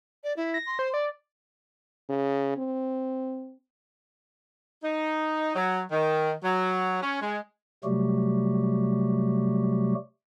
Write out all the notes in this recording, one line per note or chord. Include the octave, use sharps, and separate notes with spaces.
D5
E4
A#6
C6
C5
D5
C#3
C4
D#4
F#3
D#3
F#3
C#4
G#3
C3 F#3 G3 A3 F#4 G4